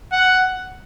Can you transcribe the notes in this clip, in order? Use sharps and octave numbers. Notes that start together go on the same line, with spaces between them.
F#5